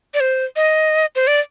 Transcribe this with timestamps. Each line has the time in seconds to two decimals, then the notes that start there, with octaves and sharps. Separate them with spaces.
0.14 D5
0.20 C5
0.56 D#5
1.16 C5
1.27 D5